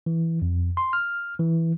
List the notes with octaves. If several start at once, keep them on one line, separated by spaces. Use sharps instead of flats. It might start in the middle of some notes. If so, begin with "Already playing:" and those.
E3
F2
C6
F6
E3